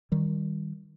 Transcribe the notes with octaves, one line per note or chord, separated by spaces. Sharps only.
D#3 G3